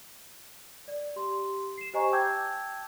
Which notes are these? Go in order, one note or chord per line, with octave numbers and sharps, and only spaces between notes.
D5
G4 C6
C7 E7
G4 C5 D#5 G#5 A#5 C#6
G5 A5 D6 E6 G6 G#6